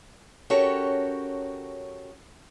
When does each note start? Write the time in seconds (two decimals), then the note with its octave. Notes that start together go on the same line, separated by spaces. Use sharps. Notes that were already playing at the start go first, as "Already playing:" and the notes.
0.50 C#4 F#4 G4 A4 A#4 C#5